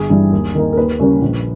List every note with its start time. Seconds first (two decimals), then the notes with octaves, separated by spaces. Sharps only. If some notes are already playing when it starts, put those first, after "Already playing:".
Already playing: G1 G#4
0.10 G2 E3 G3
0.32 D#2
0.55 D#3 A#3 D#4
0.73 A#4
0.77 D#2 B4
1.00 C#3 G3 A#3 C#4
1.22 A#1